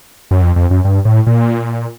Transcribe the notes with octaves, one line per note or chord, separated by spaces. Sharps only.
F#2
F2
F2
F#2
G2
A2
A#2